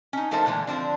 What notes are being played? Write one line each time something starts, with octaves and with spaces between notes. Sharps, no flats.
C#4 D#4
F3 A3 D#4 A4 A#4 C5
A#2 D3 E3 G#3
D3 F3 C4 D4